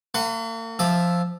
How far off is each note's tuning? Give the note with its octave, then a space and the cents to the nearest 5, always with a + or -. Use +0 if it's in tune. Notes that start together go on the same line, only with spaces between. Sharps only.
A#3 -45 F#5 +0 B5 +40
F3 +0 E5 +0 D6 +40